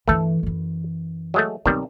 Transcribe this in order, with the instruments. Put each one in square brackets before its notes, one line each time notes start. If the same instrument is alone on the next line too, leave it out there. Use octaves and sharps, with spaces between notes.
[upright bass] G2 E3 [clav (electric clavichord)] A3 A4
[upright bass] F#2 E3
[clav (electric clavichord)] F#3 G#3 A3
[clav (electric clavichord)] B1 D#3 G3 [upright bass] C4